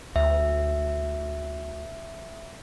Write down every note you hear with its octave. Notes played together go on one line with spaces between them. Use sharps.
D2 E5